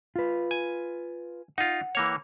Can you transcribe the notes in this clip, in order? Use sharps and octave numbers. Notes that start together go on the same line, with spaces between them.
F4 B4
G#5
D#4 F4 F#5
E3 A#3 C#5